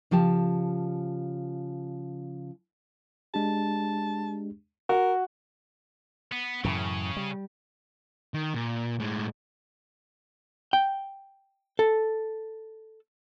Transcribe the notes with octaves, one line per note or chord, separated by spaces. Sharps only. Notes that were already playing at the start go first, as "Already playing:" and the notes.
C#3 F3 G4 A5
G#3 D4 G4 A5
F#4 A#4
B3
F#2 A2 C#3 E3
G3
D#3
A#2
A2 G#3
G5
A4